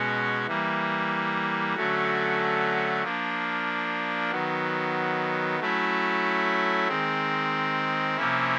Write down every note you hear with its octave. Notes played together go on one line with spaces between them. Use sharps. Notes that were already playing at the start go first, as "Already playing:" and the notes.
Already playing: B2 G#3 C#4 F#4
E3 G3 A#3
D3 F#3 A3 C#4 F#4
F3 A#3 D4
D#3 F#3 B3
F#3 A3 C#4 E4
D#3 G#3 C4
C3 F3 A#3 C#4 E4